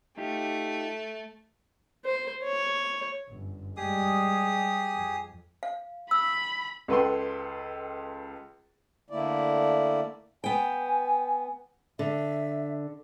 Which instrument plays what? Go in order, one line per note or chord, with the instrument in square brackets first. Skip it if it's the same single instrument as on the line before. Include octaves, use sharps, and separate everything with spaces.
[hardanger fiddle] A3 [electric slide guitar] D#4 F4 G4
[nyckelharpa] C5
C#5
[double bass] G1 F#2
[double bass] G3 G#3 [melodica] G4 G#4 D#6
[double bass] F2
[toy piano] F5
[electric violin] B5 [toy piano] E6
[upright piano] C#2 A4 B4 F#5 G5 C6
[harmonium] D3 A3 A#3 E4 D5
[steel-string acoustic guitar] B3 G5 [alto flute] G#5
[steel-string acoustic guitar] D3 [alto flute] E5